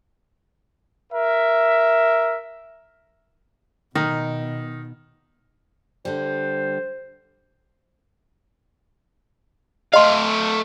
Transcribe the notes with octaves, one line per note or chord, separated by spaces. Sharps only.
A#4 E5
B2 D#3 D#4
D3 G3 C5
A3 D#5 F5 C6